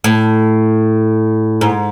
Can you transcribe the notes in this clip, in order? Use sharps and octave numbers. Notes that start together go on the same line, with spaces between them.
A2
G#2